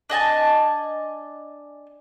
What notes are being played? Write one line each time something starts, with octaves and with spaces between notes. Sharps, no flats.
D4 D#5 G#5 A5